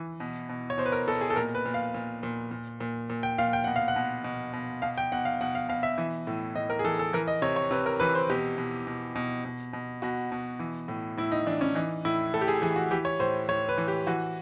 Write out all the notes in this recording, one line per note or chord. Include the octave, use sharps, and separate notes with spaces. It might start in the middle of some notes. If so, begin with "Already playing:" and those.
Already playing: E3
B2
B2
C#5
B2 C5
B4
A#4
B2 A4
G#4
A4
A#2 A#4
B4
A#2
F5
A#2
A#2
A#2
A#2
A#2
G5
A#2 F5
G5
B2 F#5
F5
F#5
B2
B2
B2
B2 F5
G5
B2 F#5
F5
B2 F#5
F5
B2 F5
E5
E3
A2
A2 D#5
A#4
G#4
E3 A4
A4
E3 A#4
D#5
C3 C#5
C#5
C3 B4
A#4
E3 B4
C5
B2 G4
B2
B2
B2
B2
B2
B2 F#4
B2
E3
A2
A2 E4
D#4
E3 D4
C#4
E3 D#4
A2 E4
A2 A4
G4
G#4
E3 G#4
F#4
E3 G4
C#5
A2 C5
A2 C#5
B4
E3
G4
E3 F#4